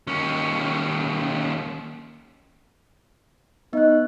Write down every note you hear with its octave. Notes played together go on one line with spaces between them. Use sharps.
D#2 C#4
B3 D#4 F#6